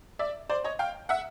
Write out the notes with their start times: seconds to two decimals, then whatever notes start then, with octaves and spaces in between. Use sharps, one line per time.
0.19 D5 E5
0.49 C5 D5
0.64 C#5 D#5
0.79 F5 G5
1.09 E5 F#5